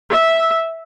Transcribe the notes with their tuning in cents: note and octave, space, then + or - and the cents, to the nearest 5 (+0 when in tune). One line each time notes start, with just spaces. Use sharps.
E5 -10